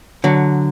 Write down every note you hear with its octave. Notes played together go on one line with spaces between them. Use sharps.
D3 F#3